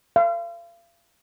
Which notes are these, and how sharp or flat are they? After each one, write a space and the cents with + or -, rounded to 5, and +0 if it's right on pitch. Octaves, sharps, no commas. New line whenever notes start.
F5 -40